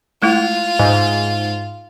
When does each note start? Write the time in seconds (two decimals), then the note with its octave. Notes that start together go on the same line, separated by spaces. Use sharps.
0.22 G#3 A3 E4 F4
0.79 G#2